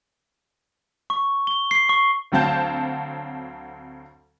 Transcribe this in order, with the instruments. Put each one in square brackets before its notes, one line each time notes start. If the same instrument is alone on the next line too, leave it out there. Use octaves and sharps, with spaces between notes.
[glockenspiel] C#6
G7
C7
C#6
[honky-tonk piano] D2 F#3 C4 F5 A5 G6